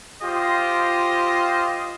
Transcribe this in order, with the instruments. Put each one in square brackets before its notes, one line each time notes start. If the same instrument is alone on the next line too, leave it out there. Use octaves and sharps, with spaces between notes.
[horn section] F4 G4 C5 D#5